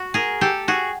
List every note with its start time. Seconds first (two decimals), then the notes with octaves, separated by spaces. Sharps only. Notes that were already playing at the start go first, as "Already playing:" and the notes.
Already playing: F#4
0.14 G#4 A#4
0.41 G4 A4
0.68 F#4 G#4